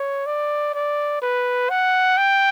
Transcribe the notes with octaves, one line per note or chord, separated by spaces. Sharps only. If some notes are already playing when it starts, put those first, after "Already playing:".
Already playing: C#5
D5
D5
B4
F#5
G5